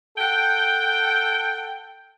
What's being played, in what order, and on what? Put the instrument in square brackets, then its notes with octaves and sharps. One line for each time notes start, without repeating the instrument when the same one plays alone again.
[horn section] A4 F#5 G5